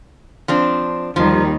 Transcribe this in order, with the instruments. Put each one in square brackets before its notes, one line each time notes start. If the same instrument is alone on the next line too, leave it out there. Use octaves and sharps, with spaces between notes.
[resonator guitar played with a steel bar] F3 C4 D4
[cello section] D#2 D#3 G3 [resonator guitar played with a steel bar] F3